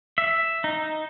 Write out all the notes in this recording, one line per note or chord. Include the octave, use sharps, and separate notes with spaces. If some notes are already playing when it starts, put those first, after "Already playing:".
E5
D#4